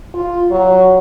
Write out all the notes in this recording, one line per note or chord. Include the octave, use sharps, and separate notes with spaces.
F4
F#3